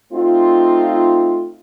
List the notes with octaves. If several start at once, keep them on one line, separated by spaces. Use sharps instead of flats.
A3 C4 D#4 F4